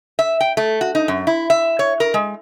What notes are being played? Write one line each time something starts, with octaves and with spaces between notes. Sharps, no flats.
E5
G5
A3
F#4
D#4
F#2
E4
E5
C#5
A#4
G#3